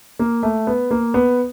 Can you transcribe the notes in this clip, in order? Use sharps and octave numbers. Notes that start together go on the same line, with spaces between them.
A#3
A3
B3
A#3
B3